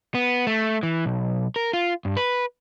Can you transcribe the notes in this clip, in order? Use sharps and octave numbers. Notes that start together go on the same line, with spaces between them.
B3
A3
E3
B1
A#4
F4
G2
B4